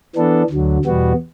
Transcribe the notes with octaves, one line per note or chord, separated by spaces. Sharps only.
E3 B3 D4 A4
D2 D3 F#3
E2 B2 G3 B3 F#4